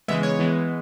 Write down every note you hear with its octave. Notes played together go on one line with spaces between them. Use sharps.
C#3 E3 G#3 B3 E5
C#5
E3 G#3 B3